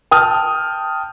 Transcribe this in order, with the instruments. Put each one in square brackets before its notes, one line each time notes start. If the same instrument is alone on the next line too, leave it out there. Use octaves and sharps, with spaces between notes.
[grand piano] G5 A5 D#6 F6